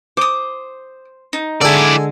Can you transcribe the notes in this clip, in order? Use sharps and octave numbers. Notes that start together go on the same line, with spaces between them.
C5 D6 D#6
D#4
D3 G#3 E4 A4 D5 G#5